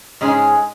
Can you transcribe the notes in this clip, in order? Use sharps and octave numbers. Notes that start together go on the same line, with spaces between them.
G#2 G#3 C#4 G#4